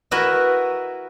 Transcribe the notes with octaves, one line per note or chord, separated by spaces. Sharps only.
E4 F#4 A#4 B4 D#5 E5